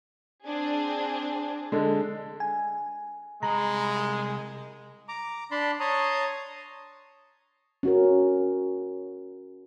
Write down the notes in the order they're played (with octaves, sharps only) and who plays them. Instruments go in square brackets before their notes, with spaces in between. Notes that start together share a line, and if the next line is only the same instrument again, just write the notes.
[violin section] C4 D4 G#4
[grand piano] D3 G#3
[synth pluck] G#5
[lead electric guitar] C2 B5 [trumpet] G#3 [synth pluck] A#5
[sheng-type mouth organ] A#5 D6
D4 A5 B5 C6
C#5 A5 A#5 C6 D#6
[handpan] C#4 F#4 A#4